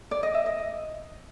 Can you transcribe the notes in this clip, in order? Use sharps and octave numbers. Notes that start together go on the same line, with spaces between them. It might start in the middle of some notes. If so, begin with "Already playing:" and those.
D5
D#5
E5
D#5